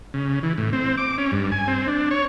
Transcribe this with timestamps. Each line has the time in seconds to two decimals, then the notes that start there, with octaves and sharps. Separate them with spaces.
0.14 C#3
0.43 E3
0.58 A2
0.73 C4
0.98 D6
1.18 C#4
1.32 G2
1.52 G#5
1.67 C4
1.87 D4
2.11 C#5